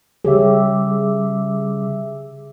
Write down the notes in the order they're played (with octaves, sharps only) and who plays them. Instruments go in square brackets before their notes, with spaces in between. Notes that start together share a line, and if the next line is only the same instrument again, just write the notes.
[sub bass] C#3 [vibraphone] G3 D6 E6 [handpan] G4 C#5 [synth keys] G#4 E5